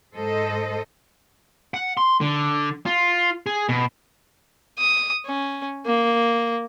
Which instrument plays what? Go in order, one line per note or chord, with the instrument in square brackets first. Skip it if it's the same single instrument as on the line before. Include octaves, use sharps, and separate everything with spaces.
[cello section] G#2 A4 C5 D#5
[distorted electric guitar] F#5
C6
D3
F4
G#4
B2
[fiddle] D#6
C#4
A#3